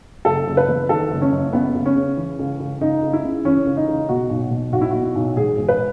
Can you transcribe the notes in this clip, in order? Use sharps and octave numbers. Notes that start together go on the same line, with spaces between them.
F#1 A4
F#1
B4
E2
D#3 A4
F#1
C#4
F#1
C#2 B3
C#2
C#4
C#3
E3
C#2
C#2
C#2 D#4
C#2
E4
C#3
E3 C#4
C#2
D#4
C#2
B2 F#4
B1
B2
B1 F#4
E4
B2 F#4
B1
E1 G#4
E1
B4